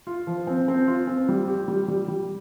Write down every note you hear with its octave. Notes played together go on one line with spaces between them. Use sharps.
F4
F3
C4
C4
F4
C4
G3
G4
G3
G3
G3